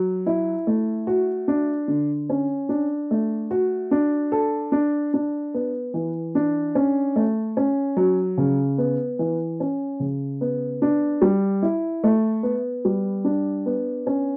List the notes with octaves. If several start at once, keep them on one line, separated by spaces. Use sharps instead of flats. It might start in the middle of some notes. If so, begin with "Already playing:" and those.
Already playing: F#3
E4
A3
F#4
D4
D3
C#4
D4
A3
F#4
D4
A4
D4
D4
B3
E3
D4
C#4
A3
C#4
F#3
C#3
B3
E3
C#4
C#3
B3
D4
G3
E4
A3
B3
G3
D4
B3
C#4